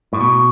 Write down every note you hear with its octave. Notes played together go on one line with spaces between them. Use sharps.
A2
B2